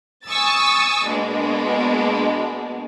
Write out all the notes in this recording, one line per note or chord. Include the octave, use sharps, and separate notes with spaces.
G#5 C#6 D#6 E6 A6
B2 G#3 A#3 D4